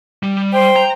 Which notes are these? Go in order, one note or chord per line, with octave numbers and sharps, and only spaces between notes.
G3
C5 G5
A#5